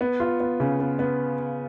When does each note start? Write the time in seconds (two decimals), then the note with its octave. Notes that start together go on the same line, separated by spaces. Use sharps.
0.01 B3
0.20 F4
0.40 B3
0.60 C#3
0.80 B3
0.99 B3